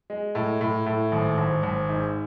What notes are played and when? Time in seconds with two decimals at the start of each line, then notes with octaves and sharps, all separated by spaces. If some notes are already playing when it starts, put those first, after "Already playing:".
0.10 G#3
0.35 A2
0.61 A2
0.86 A2
1.12 G#1
1.38 G#1
1.63 G#1
1.89 G#2